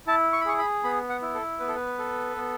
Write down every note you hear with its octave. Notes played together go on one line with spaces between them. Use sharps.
E4 A5
C#6
B5
G#4 C#6
B5
B3 B5
F#5
E4
A4
B3 B4
A4
B4
A4
B3